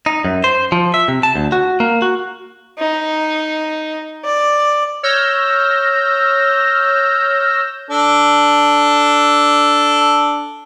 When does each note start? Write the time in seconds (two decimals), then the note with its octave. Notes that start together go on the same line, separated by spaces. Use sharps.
0.06 D#4
0.25 F#2
0.44 C5
0.72 F3
0.94 E5
1.08 C3
1.23 A5
1.36 D2
1.52 F#4
1.80 A#3
2.02 F#4
2.78 D#4
4.25 D5
5.03 C#5 E6 F6 G6 A#6
7.90 D4 A4